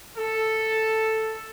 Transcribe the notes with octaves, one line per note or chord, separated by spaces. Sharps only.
A4